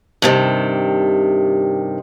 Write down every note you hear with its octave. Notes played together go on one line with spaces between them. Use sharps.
G2 C3 D#3